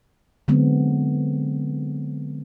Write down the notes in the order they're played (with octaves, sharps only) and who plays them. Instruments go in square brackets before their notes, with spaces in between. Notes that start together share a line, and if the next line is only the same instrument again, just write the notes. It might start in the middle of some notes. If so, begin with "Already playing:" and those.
[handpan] D3 F#3 G#3 B3 C4